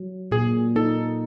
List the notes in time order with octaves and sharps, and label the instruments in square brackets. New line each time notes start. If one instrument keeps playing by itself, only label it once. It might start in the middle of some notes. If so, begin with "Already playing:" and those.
Already playing: [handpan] F#3
[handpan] A#2 [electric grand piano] G#4
[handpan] D#4 [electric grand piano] A4